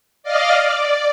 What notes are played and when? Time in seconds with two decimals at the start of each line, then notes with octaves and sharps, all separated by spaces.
0.23 D5 D#5 F5 F6
0.60 D5